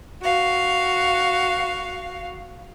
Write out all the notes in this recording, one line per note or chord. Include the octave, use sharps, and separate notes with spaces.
F#4 F5